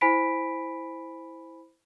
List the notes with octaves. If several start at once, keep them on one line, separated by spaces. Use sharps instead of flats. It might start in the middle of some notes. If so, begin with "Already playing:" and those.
E4 C5 G#5 B5 B6 D7